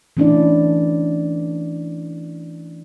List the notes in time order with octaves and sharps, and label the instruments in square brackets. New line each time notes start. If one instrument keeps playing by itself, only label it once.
[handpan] E3 A3 C#4 D4 E4 D5